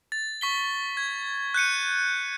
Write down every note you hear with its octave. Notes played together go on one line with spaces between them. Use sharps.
A6
C#6 B6 G7
G#6
F#6 G6 C#7 D#7